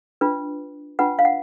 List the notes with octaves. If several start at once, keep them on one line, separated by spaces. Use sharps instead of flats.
D4 F4 B4
D4 F4 B4 F#5
F5
F#5